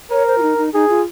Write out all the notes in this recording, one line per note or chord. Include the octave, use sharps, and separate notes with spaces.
A#4 C#5
C5
F4
D#4
D#4
D#4 G#4
F4